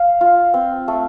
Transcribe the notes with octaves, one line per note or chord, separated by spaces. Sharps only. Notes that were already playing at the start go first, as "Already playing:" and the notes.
Already playing: F5
F4
C4
A3